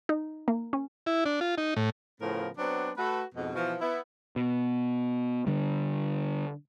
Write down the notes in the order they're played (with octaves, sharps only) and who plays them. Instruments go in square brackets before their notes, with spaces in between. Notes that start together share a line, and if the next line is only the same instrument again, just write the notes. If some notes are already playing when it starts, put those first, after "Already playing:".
[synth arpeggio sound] D#4
A#3
C#4
[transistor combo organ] E4
D4
F4
D#4
A2
[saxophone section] A2 C#3 F3 B3 A#4
F#3 B3 C4 D4
A3 F#4 A4 B4
F2 G#2 B2
B2 E3 F3
B3 E4
[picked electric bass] B2
D3 G3